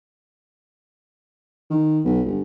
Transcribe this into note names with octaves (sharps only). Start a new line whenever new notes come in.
D#3
B1
G1